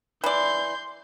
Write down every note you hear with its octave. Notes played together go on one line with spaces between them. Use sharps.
E3 D5 C6 G6